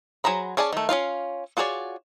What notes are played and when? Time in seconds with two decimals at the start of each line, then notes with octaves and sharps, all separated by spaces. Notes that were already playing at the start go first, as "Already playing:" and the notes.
0.24 F#3 G#4 C5 A#5 B5
0.57 C#4 G#4 D5 G#5 A5
0.73 D#3 A3
0.89 C#4 D4 F4 F5
1.57 F4 F#4 G#4 C#5 D5